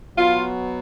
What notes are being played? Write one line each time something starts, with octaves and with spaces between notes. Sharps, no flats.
B2 F#3 F4